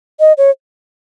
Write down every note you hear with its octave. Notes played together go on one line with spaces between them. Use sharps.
D#5
C#5